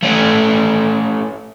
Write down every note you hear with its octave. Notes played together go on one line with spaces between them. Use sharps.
A3 C#4